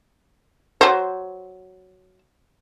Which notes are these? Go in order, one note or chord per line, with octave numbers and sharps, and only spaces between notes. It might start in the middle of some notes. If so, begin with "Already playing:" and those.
F#3 C5